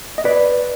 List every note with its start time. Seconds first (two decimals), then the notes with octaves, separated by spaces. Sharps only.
0.18 D#5
0.25 B4 D5